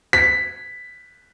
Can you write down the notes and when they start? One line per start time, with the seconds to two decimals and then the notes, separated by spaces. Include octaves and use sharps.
0.13 B6